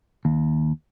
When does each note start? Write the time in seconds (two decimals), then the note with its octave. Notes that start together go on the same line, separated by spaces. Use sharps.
0.25 D#2